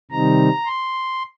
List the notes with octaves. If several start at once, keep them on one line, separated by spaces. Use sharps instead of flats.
C3 D#3 G3 C4 D#4 A#5
C6